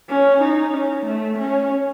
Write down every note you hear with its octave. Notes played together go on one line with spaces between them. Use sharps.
C#4
D#4
C#4
A3
C#4